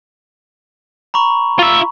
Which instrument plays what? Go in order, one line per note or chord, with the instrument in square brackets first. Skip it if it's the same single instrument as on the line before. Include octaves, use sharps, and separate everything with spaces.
[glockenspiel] A#5 B5 C#6
[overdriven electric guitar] F4 E5